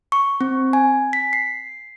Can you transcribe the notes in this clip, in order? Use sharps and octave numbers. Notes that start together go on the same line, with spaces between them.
C#6
C4
G#5
B6
C7